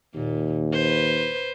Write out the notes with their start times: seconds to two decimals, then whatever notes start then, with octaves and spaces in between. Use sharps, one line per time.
0.14 D#2 A#2
0.73 B4 C5